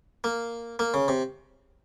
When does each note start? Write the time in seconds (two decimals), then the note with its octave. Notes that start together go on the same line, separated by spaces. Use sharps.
0.24 A#3
0.79 A#3
0.94 C#3
1.08 C3